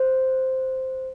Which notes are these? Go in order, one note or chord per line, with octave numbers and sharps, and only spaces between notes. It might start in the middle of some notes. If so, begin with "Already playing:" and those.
Already playing: C5